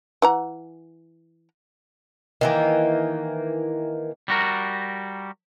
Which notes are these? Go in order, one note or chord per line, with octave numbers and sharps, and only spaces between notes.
E3 F#5 A#5
D#3 E3 A#3
G3 F#4 A#4